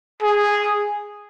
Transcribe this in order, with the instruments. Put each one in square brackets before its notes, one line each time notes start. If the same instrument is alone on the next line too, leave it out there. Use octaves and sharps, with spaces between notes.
[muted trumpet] G#4